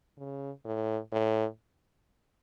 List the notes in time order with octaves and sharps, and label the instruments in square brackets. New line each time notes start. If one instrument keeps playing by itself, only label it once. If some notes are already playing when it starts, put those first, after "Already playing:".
[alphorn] C#3
A2
A2